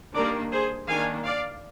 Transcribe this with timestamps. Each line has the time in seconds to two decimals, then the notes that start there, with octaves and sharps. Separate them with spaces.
0.15 D#3 G3 A#3 D4 A#4 D5
0.51 G#4 C5
0.88 D#3 A#3 D4 F5 G#5
1.25 D5 F5